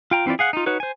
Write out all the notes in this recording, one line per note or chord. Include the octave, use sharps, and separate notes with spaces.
F4 G5 A#5
E3 C4 E4 F4 D5
G#4 F5 F#5
D#4 F4
D#4 F#4 B4 C#5
C5 G#5